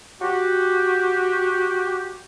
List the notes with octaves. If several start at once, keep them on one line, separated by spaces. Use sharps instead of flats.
F#4 G4